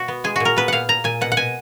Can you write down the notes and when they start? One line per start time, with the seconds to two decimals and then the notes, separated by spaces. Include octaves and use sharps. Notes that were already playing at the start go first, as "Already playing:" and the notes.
Already playing: B2 F#4
0.08 B3
0.24 G#3 G#4
0.36 A#2 F#4
0.45 A#4
0.56 B3 B4
0.68 A#2 F5 F#5
0.89 A#2 A#5
1.04 A#2 G#5
1.21 B2 F#5
1.32 F#5
1.37 B2 G#5